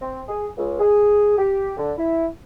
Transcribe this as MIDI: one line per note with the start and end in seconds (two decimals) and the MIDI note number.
0.01 0.21 60
0.28 0.47 68
0.58 0.78 37
0.80 1.38 68
1.38 1.74 67
1.77 1.92 50
1.98 2.27 64